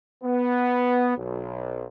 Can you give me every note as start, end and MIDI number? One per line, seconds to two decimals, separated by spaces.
0.24 1.16 59
1.17 1.85 35